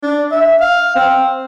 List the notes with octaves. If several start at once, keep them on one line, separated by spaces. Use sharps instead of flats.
D4
E5
F5
C4